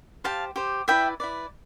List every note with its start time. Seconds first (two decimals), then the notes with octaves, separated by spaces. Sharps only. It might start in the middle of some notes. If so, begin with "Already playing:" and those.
0.24 G4 C5 F5 A5
0.56 G4 C5
0.88 E4 B4 D5 E5 G5
1.20 E4 B4 D5